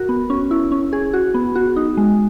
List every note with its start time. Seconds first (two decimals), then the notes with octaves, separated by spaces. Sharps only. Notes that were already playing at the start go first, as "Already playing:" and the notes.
Already playing: F#4 A#4
0.09 B3
0.30 C#4
0.51 E4
0.72 C#4
0.93 G#4
1.13 F#4
1.34 B3
1.55 F#4
1.76 D#4
1.97 G#3